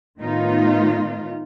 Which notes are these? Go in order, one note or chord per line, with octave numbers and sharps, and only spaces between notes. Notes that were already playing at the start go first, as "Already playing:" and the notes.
A2 D#3 B3 D#4 F4